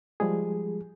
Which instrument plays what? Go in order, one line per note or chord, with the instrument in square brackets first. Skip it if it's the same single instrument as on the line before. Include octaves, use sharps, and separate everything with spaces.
[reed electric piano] F3 G3 G#3 G#4